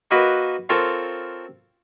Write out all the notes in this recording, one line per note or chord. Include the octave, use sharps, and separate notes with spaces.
A#3 D#4 F#4 A#4 B4
C4 F4 A4 A#4 C#5 F5